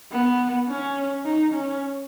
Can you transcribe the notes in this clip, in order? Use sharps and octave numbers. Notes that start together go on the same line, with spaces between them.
B3
C#4
D#4
C#4